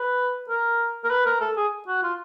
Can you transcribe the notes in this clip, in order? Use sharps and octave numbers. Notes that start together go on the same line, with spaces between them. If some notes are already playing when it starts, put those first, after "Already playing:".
Already playing: B4
A#4
A#4
B4
A#4
A4
G#4
F#4
F4